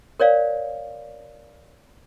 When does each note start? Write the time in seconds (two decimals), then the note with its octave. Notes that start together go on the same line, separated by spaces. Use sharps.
0.20 A#4 C#5 D5 F5